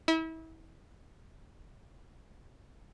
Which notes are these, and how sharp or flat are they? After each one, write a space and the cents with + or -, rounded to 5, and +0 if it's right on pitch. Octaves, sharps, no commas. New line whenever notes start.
E4 -35